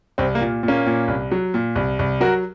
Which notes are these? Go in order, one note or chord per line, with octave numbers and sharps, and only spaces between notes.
C2 C4
A#3
A#2
A#2
A#3 C#4
A#2
C2
F#3
A#2
C2
C2
F#3 F#4 A#4